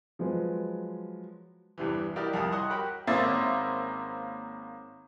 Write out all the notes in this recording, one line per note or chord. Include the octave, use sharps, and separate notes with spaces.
F3 F#3 G#3 B4
E2 G2 C3 E3
E4 F#4 G4 A#4 D5 D#5
C2 F2 A#4 A5 D#6
C#5 D#5 F#5 C6 C#6 D#6
F#4 G4 A#4 F#5 G5 B5
G#1 A#3 C#4 C5 E5 A6